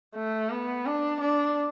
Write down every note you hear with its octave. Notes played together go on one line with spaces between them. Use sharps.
A3
B3
D4
D4